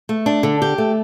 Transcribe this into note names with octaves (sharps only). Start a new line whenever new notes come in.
A3
D4
D3
G4
A3